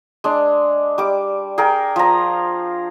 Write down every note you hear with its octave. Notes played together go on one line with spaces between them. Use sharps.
G#3 D4
G3 D6
G#4 A#4 G5
F3 A#5